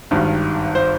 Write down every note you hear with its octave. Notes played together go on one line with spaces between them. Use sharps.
G#1 G2 D#3
C5